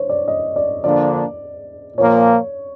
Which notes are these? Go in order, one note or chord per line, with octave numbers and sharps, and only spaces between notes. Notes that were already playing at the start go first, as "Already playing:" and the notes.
Already playing: C5 C#5
D5
D#5
D5
D3 F3 A#3 D4 D5
A#2 F3 A#3 C#5